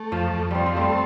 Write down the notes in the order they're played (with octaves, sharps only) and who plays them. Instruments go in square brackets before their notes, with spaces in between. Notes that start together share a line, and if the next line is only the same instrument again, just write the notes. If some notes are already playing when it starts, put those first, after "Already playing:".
Already playing: [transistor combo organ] A3
[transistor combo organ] F2 [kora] F3
[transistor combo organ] F2
[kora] F3 G3 [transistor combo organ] C4
[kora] F3
[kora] G3 [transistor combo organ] A3